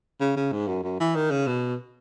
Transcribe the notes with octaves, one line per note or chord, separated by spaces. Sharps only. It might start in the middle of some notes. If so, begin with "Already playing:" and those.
C#3
C#3
G#2
F#2
F#2
E3
D#3
C#3
B2